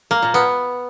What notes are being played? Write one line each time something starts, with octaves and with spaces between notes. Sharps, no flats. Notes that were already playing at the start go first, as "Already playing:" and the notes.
A#3
A#2
B3